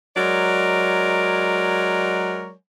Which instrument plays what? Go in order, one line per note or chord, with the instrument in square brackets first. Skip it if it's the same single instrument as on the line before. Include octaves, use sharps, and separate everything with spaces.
[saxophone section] F#3 G#3 A#4 C#5 D5